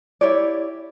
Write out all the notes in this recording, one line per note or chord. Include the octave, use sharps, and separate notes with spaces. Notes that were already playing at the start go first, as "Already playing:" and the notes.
E4 G4 C#5 D5